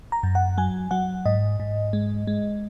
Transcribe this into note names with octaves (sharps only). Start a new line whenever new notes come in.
A#5
F#2
F#5
F#3 G#5
F#3 F#5
G#2 D#5
G#2
G#3
G#3